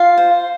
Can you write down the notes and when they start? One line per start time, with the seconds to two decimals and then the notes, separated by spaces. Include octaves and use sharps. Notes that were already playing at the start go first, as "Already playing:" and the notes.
Already playing: F4 F5
0.18 C5